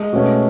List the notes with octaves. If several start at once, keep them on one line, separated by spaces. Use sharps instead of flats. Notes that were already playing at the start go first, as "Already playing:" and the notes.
Already playing: G#3
B2 A3 C#4